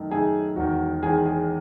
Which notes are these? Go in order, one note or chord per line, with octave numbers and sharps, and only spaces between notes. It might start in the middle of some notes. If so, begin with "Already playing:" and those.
Already playing: F#2 D#3 A3 D#4
F#2 D#3 A3 D#4 G#4
E1 E2 D#3 F#4
E1 E2 D#3 G#4
G#4